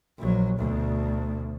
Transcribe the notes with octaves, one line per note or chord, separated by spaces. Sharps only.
A#1 F#3
D2 B2